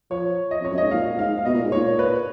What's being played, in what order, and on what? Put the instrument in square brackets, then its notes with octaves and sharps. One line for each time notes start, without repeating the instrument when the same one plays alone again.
[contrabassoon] F3 [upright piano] C#5
[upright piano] D#5
[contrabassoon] F2 [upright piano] C#5
[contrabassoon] F#2
[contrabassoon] G#2 [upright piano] D#5
[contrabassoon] A#2 [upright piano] F5
[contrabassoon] G#2 [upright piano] F5
[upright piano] F5
[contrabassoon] B2 [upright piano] D#5
[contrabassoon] A#2
G#2
[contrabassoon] A#2 [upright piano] C#5
[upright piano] B4